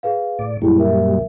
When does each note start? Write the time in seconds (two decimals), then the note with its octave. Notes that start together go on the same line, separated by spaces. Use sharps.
0.03 G#4 B4 F5
0.39 A2 D5
0.62 F#2 A#2 G3 E4 G#4
0.78 A#4 E5